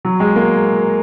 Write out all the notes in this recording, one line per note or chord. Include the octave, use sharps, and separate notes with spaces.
F#3
G#3
A#3